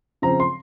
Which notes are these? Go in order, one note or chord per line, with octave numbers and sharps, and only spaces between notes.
C#3 F3 C4 A#5
C6